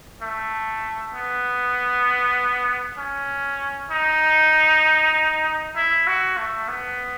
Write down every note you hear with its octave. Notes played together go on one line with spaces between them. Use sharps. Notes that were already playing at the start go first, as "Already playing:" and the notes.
A3
B3
C#4
D#4
E4
F#4
A3
B3